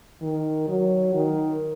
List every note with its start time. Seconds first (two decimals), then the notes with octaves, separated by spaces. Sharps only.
0.22 D#3
0.68 F#3
1.14 D#3